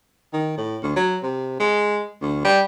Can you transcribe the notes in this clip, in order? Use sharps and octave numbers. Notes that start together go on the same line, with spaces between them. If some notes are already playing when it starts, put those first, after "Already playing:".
D#3
A2
D2
F#3
C3
G#3
D2
G3